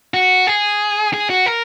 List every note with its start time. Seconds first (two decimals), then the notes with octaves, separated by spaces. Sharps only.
0.14 F#4
0.47 G#4
1.13 G#4
1.30 F#4
1.46 A#4